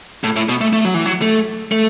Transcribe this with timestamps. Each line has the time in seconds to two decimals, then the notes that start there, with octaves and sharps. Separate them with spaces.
0.24 A2
0.36 A2
0.49 B2
0.61 A3
0.73 A3
0.85 F#3
0.94 E3
1.06 F#3
1.22 A3
1.72 A3